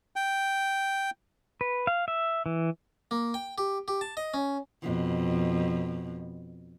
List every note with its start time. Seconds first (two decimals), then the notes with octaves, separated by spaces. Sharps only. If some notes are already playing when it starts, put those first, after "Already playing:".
0.16 G5
1.61 B4
1.87 F5
2.08 E5
2.46 E3
3.11 A#3
3.34 G5
3.58 G4
3.88 G4
4.01 A5
4.17 D#5
4.34 C#4
4.83 F2 B2